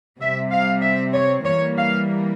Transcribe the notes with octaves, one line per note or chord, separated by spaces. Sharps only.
C3 G3 C4 E5
F5
E5
C#5
E3 G3 A#3 C#5
F5